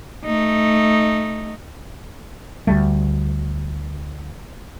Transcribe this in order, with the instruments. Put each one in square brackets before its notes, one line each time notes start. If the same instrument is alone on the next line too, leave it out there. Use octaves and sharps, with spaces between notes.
[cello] A3 D#4
[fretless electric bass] D2 G3 A3